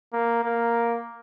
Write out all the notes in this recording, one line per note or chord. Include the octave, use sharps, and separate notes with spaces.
A#3
A#3